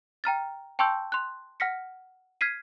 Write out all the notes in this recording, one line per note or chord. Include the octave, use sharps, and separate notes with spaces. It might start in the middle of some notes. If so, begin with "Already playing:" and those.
G5 A#5 F6 A6
G5 A5 C6 C#6 E6 G6
C6 F#6
F#5 F6 A#6 B6 C#7
F6 G#6 B6 C7 D#7